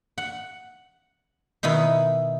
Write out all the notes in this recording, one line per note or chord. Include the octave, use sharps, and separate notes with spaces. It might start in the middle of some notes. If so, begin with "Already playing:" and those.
F#5
B2 D#3 D#4 E4